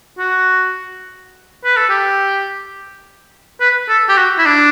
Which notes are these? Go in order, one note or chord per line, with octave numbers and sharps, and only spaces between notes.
F#4
B4
A4
G4
B4
A4
G4
F#4
E4
D4